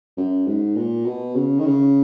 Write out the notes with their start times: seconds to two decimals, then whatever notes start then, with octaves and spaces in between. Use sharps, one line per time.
0.17 F#2
0.47 G#2
0.76 A#2
1.05 B2
1.35 C#3
1.59 D#3
1.65 C#3